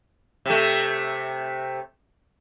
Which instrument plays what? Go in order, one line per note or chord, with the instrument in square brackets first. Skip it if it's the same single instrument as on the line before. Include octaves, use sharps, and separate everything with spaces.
[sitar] C3 A3